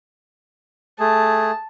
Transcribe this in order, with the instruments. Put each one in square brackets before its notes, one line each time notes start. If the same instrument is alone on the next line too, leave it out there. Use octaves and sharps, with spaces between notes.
[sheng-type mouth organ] A3 G#4 [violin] A5